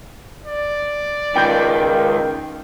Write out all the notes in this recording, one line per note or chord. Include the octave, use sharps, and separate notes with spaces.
D5
C#2 D#3 G5 G6